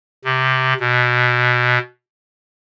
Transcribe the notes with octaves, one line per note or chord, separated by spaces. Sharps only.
C3
B2